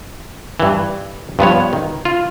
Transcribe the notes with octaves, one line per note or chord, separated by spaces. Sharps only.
G2 E3
G2 F3 B3 C#5
D#3
F4